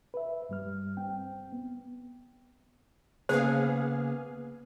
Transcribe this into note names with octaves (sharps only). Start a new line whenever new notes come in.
B4 E5
G2 G3 F6
C4 G5
B3
C#3 A#3 B3 G#4 C5 F5